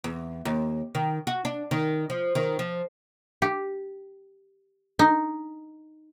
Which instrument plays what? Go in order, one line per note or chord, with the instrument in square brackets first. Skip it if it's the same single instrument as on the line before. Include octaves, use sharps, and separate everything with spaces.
[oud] E2
D#2
D#3
F#4
D4
D#3
F3
D#3
F3
[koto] G4
D#4